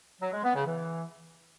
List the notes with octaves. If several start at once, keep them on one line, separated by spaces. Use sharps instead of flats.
F#3
G#3
B3
C#3
E3